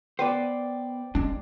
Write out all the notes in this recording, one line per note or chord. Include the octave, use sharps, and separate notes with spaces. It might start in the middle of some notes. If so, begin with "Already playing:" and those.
B3 B4 C5 D5 G5
G#3 C#4 D4